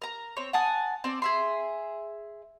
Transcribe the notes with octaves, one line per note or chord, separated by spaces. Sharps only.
A#4 A#5
C4 C#5
F#5 G#5 A5 D#6
C4 D5
G#4 E5 C6